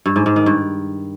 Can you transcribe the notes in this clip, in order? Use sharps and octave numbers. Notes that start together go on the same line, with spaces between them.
G2
G#2
G#2
D#3
G2